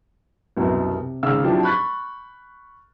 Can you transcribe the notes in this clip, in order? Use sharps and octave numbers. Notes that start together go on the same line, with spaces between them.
C2 F#2 B2
C3
G#1 C#3 F5 E6
F3 F#3 C4 D4 E4 G4
B5 C#6 F#6 A6 B6